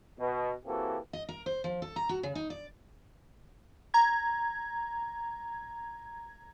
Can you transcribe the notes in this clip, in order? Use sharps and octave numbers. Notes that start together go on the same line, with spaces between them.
B2
E3 A#3 C4 F#4 G4 A4
D#5
A#4
C5
F3
A4
A#5
F#4
C#3
D#4
D5
A#5 G#6